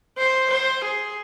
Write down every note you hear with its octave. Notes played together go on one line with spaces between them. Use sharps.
C5
C5
G#4